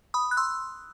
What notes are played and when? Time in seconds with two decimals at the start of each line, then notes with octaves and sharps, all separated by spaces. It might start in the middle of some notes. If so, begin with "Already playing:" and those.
0.14 B5 D#6
0.31 F#6
0.37 C6 E6